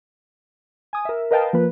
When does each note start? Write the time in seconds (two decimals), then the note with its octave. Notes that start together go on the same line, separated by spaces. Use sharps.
0.93 G#5 D#6
1.05 A#4 E5
1.31 A#4 B4 D#5 F5 G5 A5
1.53 F3 A#3 B4